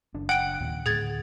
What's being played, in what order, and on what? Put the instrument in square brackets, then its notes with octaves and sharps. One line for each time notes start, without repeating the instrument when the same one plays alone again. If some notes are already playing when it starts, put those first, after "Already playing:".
[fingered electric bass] F#1 D4
[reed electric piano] F#5 [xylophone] G5 D7
[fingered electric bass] D#2 A#2
[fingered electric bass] D2 A2 [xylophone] G#4 G#6 A6